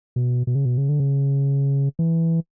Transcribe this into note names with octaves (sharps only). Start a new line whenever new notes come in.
B2
B2
C#3
B2
C#3
D3
C#3
E3